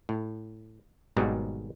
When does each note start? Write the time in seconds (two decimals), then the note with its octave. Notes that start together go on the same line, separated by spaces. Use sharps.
0.09 A2
1.16 G#1 G#2 B2 D#3 F#3 G3